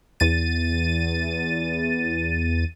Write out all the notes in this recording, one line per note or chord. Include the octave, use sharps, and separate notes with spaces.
E2 A6 D#7